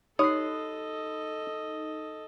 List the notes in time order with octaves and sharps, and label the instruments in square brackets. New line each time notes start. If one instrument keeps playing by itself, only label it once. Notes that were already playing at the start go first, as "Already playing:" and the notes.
[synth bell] D#4 [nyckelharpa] A4 D#5 [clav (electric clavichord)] C#5 [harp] D#6 F#6 C7